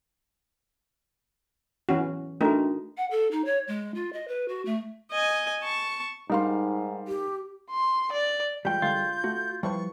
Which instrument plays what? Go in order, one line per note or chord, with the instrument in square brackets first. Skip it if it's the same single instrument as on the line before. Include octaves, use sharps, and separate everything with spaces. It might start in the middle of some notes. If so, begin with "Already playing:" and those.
[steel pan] E3 C#4 F#4
[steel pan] A3 D#4 A#4 [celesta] D4 F#4
[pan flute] F#5
A4
D#4
C#5
G#3
F4
D#5
B4
F#4
A3
[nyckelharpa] D#5 G#5
A5 C#6
[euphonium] G#2 [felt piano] G3 F5 C6 [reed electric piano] D#4 A#4
[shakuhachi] G4
[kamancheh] C6
D5
[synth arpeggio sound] E3 G#3 F4 [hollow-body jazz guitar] G3 G5 [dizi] G6
[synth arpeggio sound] D3 G#3 [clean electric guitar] F4
[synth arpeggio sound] A3 [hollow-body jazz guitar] F#4
[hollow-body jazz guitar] F3 G3 [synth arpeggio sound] E4 B4 C5 [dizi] C#6